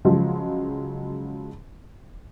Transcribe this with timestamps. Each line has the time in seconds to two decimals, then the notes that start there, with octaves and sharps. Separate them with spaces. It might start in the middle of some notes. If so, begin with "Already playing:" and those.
0.05 C#3 F3 F#3 G#3